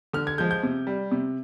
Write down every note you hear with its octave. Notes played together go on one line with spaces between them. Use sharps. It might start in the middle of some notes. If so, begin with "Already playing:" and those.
D3 F6
G#6
F3 G#3 G6
G6
C3
G3
C3